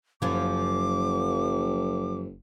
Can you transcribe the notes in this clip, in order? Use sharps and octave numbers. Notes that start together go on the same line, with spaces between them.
F#1 F#2 F3 D6